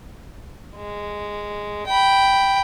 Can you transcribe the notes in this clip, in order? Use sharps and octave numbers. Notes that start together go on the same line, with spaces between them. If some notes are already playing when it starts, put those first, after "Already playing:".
G#3
G5 B5